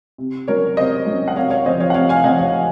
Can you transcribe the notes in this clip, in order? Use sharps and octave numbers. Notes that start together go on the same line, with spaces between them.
C3
F#3 C#4 A#4 C#5
C3 C5 D#5
F#3 C#4
F#5
C3 C#5 F5
C#5 F5
F3 C4 C5 D#5
C#5 F5
F#5
C3 C#5 F5
F5 G#5
F3 C4 D#5 F#5
C#5 F5